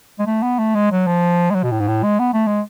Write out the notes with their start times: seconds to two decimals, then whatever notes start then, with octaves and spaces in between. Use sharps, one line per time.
0.19 G#3
0.26 A3
0.42 B3
0.58 A3
0.75 G#3
0.91 F#3
1.07 F3
1.51 G#3
1.55 F#3
1.63 B2
1.72 A2
1.80 G#2
1.88 A2
2.03 G#3
2.19 B3
2.33 A3
2.47 G#3